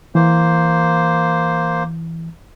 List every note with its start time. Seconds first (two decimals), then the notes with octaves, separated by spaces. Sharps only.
0.15 E3 A#3 C5